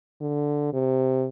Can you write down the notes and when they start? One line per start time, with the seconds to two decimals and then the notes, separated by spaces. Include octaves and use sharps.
0.21 D3
0.73 C3